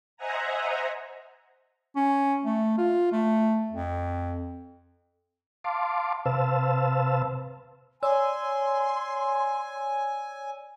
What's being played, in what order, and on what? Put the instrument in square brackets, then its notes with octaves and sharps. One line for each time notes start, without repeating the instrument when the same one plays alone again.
[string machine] C5 D#5 E5 F#5 G#5 A#5
[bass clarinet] C#4
A3
F4
A3
F2
[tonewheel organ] F5 A5 C6 D6
C3 B4 C5 F5 A5 E6
[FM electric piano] C#5 D5 E6 [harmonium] G#5 [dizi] C6